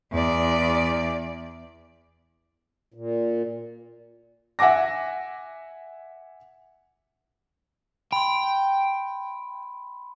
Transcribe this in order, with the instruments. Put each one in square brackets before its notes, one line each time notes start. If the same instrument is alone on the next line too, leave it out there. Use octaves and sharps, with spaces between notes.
[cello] E2 D5
[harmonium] A#2
[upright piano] E5 F#5 G#5 D6 A#6
[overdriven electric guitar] G5 [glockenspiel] B5 C6